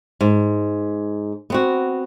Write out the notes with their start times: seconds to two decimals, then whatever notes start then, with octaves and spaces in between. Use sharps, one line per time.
0.21 G#2
1.50 B3 C4 F#4